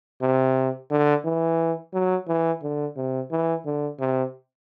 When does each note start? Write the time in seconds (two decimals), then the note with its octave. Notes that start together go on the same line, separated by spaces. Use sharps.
0.22 C3
0.91 D3
1.25 E3
1.94 F#3
2.28 E3
2.63 D3
2.97 C3
3.31 E3
3.66 D3
4.00 C3